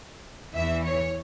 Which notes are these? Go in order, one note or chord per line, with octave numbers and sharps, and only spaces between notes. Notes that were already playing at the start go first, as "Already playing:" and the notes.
E2 E3 E5
C#5